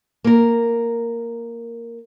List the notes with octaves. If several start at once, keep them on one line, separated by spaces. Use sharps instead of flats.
A#3 A#4